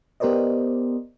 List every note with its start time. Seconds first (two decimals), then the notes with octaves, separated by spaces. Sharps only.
0.20 B3 G4 A#4 C5 D5 D#5